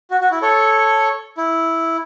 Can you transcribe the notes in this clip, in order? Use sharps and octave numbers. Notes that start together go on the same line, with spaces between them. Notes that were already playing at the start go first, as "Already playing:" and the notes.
F#4
F#4
E4
A4 C#5
E4